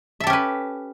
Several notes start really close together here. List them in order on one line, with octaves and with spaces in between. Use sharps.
E5 A4 G4 C#4 B4